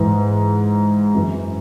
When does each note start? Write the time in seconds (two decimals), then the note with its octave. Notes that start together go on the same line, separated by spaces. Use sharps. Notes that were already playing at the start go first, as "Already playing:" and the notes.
Already playing: G#2 E3
1.14 F#2 E3